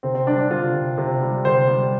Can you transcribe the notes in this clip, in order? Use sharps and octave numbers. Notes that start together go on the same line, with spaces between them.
C3 C4
C4
G3 D4
D4
C3 F4
C3
C3
G3
C3 C5
G3